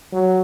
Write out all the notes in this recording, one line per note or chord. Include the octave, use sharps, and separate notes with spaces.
F#3